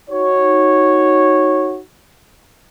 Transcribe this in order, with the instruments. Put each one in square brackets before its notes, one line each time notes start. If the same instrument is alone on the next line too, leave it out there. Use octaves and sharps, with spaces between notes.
[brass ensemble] D#4 F#4 C#5